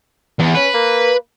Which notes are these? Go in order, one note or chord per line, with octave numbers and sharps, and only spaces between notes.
E2
C#4 B4
A#3